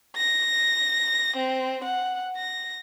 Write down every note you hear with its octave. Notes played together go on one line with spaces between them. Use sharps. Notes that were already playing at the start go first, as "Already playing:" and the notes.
A#6
C4
F#5
A#6